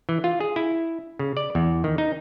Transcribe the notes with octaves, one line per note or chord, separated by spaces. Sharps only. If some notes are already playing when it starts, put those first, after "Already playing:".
E3
F4
G#4
E4
C#3
D5
E2
D#3
D#4